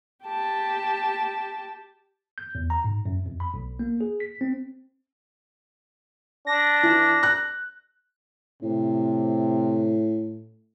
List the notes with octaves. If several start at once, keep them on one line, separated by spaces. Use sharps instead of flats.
G4 A5
G6
E2
A#5
G#2
F#2
F2
B5
B1
A#3
G#4
B6
C4
D4 A#6
E3
F#6
A2 C3